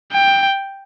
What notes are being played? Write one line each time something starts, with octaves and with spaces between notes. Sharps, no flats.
G5